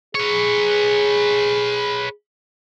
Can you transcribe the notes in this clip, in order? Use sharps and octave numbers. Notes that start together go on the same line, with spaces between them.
G#4 B4 C#5